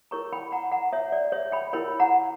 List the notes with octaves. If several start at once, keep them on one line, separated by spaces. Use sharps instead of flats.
E4 A#4 C#5 A#5 C#6
G5 B5
F#5 A#5
F#5 A#5
C#5 E5
D5
C#5 E5
G5 B5
E4 A#4 C#5 G5 B5
F#5 A#5